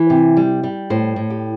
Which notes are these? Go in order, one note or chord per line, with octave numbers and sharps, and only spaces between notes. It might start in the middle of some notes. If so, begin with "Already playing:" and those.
Already playing: E3
C3
G3
G3
A2 C5
A2
G4